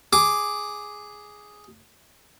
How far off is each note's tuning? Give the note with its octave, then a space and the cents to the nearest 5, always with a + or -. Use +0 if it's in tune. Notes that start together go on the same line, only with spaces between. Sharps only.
G#4 +0 D6 +0